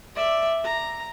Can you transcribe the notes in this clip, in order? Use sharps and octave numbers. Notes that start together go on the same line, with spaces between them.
D5 E5
A#5